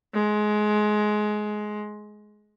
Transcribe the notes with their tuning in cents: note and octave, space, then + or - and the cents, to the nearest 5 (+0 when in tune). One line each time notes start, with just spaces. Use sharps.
G#3 +20